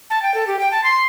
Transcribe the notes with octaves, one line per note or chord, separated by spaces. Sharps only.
A5
G5
A4
G4
G5
A5
C6